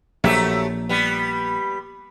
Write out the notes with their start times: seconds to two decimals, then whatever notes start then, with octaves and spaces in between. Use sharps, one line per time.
0.24 A#1 F#3 A3 G4
0.89 G3 B3